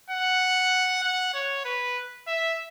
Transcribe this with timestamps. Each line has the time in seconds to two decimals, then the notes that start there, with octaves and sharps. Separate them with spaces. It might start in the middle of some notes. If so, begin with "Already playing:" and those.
0.10 F#5
1.03 F#5
1.34 C#5
1.65 B4
2.27 E5